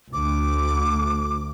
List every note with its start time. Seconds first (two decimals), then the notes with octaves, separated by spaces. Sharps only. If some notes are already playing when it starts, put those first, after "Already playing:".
0.13 D2 D6